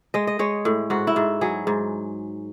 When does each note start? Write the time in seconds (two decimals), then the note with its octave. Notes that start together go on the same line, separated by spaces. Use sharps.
0.14 G#3 D#5
0.27 D#5
0.39 G#3 C#5
0.65 A2
0.90 G#2 F#4
1.07 E4
1.16 G#2
1.41 F#3 G#4
1.67 G#2